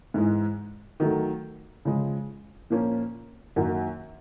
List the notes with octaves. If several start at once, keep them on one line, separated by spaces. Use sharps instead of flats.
G#2 E3 G#3
D#3 F#3 A3
C#3 F3 G#3
A#2 F3 A#3 C#4
F#2 D#3 F#3 A#3